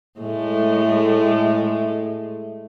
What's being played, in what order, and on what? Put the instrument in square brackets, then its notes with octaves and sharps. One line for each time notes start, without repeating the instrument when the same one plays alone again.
[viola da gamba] A2 G#3 A3